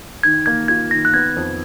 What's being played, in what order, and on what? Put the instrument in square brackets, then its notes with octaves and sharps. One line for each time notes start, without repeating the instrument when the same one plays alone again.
[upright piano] D#3 [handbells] G#6
[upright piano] A#3 [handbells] G#6
[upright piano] F4 [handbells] G#6
[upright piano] D#3 [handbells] A#6
[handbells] F#6
[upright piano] B3 [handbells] G#6
[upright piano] F2